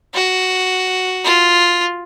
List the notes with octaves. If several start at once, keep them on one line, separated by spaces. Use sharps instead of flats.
F#4
F4